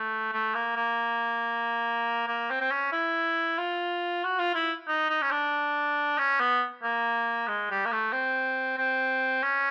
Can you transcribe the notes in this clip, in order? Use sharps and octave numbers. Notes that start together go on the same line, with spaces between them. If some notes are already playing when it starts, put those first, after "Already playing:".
Already playing: A3
A3
A#3
A#3
A#3
C4
C4
C#4
E4
F4
F#4
F4
E4
D#4
D#4
C#4
D4
C#4
B3
A#3
G#3
G3
A#3
A3
C4
C4
C#4